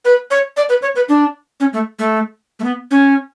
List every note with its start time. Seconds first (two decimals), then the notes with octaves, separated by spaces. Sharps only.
0.05 B4
0.31 C#5
0.57 D5
0.69 B4
0.82 C#5
0.96 B4
1.09 D4
1.60 C#4
1.73 A3
1.99 A3
2.59 A3
2.64 B3
2.91 C#4